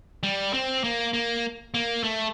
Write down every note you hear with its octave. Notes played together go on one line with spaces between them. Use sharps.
G3
C4
A#3
A#3
A#3
A3